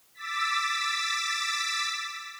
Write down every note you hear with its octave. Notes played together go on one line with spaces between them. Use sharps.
D6 E6 A6 B6